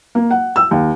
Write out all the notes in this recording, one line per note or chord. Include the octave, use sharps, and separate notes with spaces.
A#3
F#5
E6
D#2